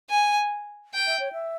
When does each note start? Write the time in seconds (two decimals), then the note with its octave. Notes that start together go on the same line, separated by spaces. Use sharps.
0.10 G#5
0.94 G5
1.07 E5
1.20 C#5
1.33 E5